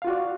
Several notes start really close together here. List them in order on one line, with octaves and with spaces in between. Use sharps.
F5 F4 F#4 D5